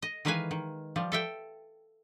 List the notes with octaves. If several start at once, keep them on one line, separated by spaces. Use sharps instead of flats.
D#5
D#3 E3 G#3 B4 F5 G#5
D#3
F3 G3
A4 E5 G5